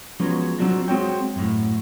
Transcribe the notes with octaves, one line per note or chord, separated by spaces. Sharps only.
F3 F#3 G#3 B3 C#4
F#3 C4 D4 F4 F#4
G#3 C4 F#4 C#5 G5
F#2 A2